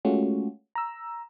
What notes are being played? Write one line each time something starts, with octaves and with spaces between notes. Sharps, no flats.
G#3 A3 C#4 F4 F#4
A#5 E6